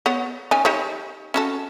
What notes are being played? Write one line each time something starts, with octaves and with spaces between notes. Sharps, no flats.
B3 C#5 F#5
D#3 C#4 G#5
D#4 G4 C#5
C#4 F#4 A4